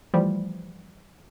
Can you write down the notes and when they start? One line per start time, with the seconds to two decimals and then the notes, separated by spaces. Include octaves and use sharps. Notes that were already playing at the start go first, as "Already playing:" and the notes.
0.14 E3 F3 G3 A3